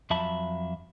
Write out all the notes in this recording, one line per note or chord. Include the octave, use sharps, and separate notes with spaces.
F2 F#3 E5 A5 B5